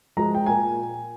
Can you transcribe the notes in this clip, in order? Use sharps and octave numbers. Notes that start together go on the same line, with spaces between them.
F3 G#3 A#5
G5
A#2 G#5